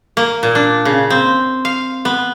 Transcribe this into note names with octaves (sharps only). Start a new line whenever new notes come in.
A#3
A#2
D4
C#3
C4
F5
B3